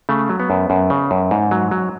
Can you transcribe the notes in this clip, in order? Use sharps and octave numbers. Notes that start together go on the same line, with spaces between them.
C#3 A3
F#3
B3
F#2
F#2
C#3
F#2
G#2
F#3
F#3